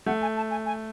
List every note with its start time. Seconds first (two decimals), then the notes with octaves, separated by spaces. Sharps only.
0.06 A3 F#5
0.22 G#5
0.36 A5
0.50 G#5
0.66 G#5